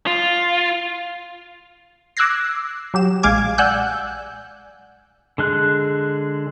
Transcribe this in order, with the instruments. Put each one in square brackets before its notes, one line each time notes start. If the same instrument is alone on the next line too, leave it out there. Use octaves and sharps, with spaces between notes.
[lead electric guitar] F4
[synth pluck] D6 E6 F#6 G#6 A#6 C7
F#3 G4 E7
A#1 G#3 F5 G#5 D6 G#6
D5 F#5 G#5 E6 F#6 G6
[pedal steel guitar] D3 G#3 F#6